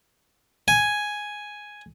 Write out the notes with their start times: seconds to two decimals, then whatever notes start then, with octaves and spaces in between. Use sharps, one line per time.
0.68 G#5